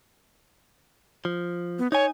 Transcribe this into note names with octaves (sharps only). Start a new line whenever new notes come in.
F3
B3
D#4 C#5 G#5